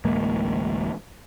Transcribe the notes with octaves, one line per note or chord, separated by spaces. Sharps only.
D1 A1 G#3 A#3